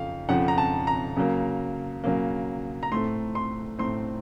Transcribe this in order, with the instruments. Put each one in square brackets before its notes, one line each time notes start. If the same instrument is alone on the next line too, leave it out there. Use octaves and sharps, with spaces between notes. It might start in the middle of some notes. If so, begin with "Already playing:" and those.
Already playing: [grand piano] F2 C#3 F3 F5
F2 C#3 F3 F#5
A#5
A5
A#5
C#3 F#3 A#3
C#3 F#3 A#3
A#5
A2 A3 C4 C6
C6
A2 A3 C4 C6